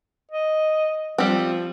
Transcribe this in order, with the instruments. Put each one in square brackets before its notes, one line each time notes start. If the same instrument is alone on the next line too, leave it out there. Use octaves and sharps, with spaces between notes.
[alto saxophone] D#5
[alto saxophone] F3 [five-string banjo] G3 C4